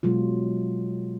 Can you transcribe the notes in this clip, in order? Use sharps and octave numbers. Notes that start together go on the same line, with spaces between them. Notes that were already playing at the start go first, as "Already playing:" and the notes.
B2 F#3 G#3 F4